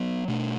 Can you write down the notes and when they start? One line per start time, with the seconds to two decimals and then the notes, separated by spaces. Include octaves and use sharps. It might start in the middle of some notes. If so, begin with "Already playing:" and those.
Already playing: F#3 B3
0.28 B2 A3 D4